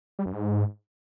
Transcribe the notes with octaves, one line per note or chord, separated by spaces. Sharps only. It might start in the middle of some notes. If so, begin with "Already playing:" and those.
G3
F#2
G#2